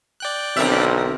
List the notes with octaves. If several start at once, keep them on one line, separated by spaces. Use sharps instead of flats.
D5 G5 F#6
B1 D3 C4 A#4 E5